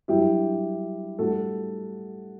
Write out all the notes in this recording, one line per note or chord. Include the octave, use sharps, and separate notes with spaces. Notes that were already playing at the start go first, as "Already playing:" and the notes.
G2 F#3 E4 G4
A2 G3 F#4 A4